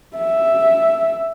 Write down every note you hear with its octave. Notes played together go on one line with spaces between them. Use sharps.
E5